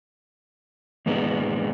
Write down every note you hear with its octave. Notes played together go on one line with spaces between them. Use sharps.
D#2 G#2 B2 G#3 B3 D4